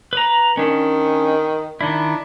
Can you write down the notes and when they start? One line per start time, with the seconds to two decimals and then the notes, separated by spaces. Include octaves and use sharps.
0.13 B4 A#5
0.57 D#3 C#4 D4
1.81 D#3 D4 E4